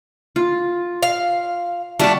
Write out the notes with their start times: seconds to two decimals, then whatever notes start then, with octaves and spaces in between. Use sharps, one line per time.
0.36 F4
1.03 F5
1.99 G3 A3 D4 F#4 A5